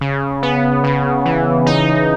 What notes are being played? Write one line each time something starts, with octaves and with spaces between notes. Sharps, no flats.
C#3
B3
C#3
E3
D#4